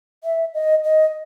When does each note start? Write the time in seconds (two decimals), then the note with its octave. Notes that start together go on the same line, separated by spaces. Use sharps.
0.24 E5
0.54 D#5
0.84 D#5